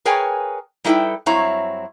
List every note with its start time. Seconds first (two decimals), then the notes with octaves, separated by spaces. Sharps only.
0.05 G#4 A#4 B4 C#5 G5 G#5
0.84 G3 D#4 E4 A4 B4 G5
1.26 G2 F#3 C4 E4 C#5 A#5